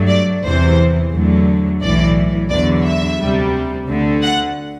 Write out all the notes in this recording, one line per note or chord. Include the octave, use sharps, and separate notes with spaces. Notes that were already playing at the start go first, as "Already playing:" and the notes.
Already playing: G2 F#3 A3
D5
E2 C3 E3 C5
E2 D3 F#3 A3
B1 A2 E3 D5
E2 D3 F#3 D5
E5
D2 C3 G3
D2 D3 A3
F#5